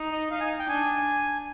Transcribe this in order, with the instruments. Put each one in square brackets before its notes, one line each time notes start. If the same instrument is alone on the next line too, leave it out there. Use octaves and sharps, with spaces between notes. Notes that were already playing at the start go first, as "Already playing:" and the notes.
Already playing: [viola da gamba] D#4
[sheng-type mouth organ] D#5
[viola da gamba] D#4 [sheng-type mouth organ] F5
[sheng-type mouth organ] G#5
G5
[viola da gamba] D4 [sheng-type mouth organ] G#5